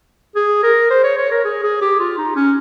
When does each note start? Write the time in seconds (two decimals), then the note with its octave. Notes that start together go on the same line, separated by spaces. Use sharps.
0.36 G#4
0.63 A#4
0.90 C5
1.04 C#5
1.18 C#5
1.31 A#4
1.45 G#4
1.63 G#4
1.81 G4
2.00 F4
2.18 D#4
2.36 C#4